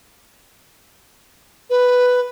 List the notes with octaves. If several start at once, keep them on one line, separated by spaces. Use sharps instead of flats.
B4